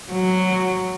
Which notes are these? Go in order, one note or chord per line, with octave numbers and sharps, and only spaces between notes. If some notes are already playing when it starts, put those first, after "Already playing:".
F#3